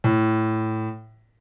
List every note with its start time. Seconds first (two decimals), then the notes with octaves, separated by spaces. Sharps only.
0.04 A2